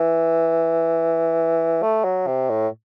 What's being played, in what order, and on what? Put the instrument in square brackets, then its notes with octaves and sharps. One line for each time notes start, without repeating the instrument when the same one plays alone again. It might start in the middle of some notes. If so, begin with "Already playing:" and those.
Already playing: [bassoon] E3
A3
F#3
C3
A2